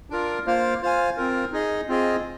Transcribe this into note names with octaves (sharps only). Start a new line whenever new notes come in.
D4 F4 A#4
A#3 F4 C5 F5
F4 C5 F5 G#5
C4 F4 A#4
D#4 G#4 D#5
C4 F4 G#4 D#5